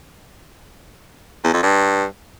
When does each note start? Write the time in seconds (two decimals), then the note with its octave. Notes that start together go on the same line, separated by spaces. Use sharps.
1.44 E2
1.54 F2
1.63 G2